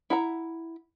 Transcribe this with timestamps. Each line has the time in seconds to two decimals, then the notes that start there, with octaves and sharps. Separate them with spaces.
0.10 E4 F#5 A#5